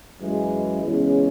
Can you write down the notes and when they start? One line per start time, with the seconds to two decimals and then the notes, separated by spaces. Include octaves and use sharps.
0.19 F#2 E3 G#3
0.83 E2 C#3 G#3 C#4